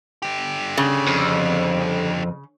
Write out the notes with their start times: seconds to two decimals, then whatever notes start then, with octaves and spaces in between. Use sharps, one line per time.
0.22 D3 G4
0.78 C#3
1.07 F2